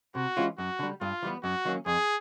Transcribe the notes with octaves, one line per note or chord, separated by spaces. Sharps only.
C3 F#4
E3 G#3 C#4 F4
F#2 F#4
D3 G3
G2 F4
E3 G3 B3
F#2 F#4
D#3 F#3 A#3 C#4
F2 G#4